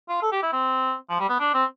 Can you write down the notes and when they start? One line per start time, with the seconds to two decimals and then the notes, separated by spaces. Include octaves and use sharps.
0.08 F4
0.22 A4
0.32 G4
0.42 E4
0.52 C4
1.09 F3
1.19 G3
1.29 B3
1.39 D4
1.54 C4